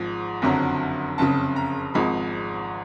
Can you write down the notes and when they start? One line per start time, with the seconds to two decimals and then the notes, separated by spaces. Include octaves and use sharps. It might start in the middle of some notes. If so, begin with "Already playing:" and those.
Already playing: G#1 G#2 F3
0.42 F#1 F2 D3 F#3
1.18 F#1 F2 C#3 A5
1.56 A#5
1.94 G#1 G#2 F3 G#3 B5